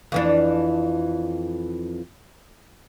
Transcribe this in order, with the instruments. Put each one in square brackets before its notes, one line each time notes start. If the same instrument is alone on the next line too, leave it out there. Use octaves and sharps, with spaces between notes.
[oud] F2 E3 D4